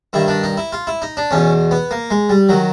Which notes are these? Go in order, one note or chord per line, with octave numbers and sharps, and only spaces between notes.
G2 D#3 E4
D4
D#4
E4
F4
E4
D#4
D4
E2 B2 C#4
B3
A#3
G#3
G3
D#3 F#3